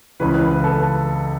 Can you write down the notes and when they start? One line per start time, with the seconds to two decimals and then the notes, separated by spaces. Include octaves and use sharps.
0.20 C#2 C#3 E3 B4
0.42 B4
0.53 B4
0.64 A4